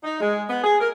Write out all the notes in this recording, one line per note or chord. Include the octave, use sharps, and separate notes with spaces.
D#4
G#3
B3
G#4
A#4